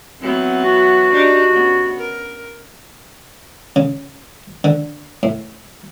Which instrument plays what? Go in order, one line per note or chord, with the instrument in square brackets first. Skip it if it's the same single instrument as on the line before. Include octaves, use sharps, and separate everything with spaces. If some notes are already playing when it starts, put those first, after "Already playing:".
[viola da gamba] E3 F#3 B3 [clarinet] C4
[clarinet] F#4
[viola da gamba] D4 D#4 G4
C#3 B3
A#4
[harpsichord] C#3
D3
A2